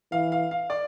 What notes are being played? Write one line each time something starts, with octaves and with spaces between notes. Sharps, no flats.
E3 F5
F5
F5
D5